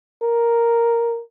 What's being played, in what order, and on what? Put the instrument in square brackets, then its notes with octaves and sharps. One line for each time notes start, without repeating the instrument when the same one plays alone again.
[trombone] A#4